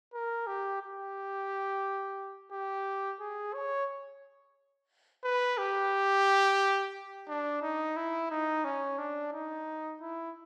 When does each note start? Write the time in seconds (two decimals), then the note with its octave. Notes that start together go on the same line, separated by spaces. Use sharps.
0.14 A#4
0.47 G4
0.82 G4
2.51 G4
3.20 G#4
3.54 C#5
5.24 B4
5.58 G4
7.28 D4
7.62 D#4
7.96 E4
8.31 D#4
8.64 C#4
8.98 D4
9.33 D#4
10.01 E4